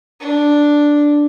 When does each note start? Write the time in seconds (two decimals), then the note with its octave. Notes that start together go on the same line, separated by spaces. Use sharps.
0.20 D4